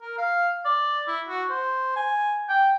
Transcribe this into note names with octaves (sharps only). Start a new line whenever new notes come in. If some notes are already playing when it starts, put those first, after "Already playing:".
A#4
F5
D5
E4
F#4
C5
G#5
G5